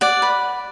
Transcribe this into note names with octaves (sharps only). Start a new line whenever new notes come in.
D5 F#5
B4